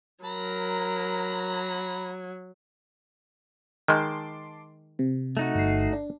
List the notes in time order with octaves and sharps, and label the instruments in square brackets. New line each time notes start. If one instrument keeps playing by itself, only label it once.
[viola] F#3 [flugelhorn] A#4 [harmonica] A#5 B5
[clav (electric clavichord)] D#3 G#3 [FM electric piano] A5 C6 D6
[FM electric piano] C3
[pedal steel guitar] A3 D#4 F#4
[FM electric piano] G1 C7
D4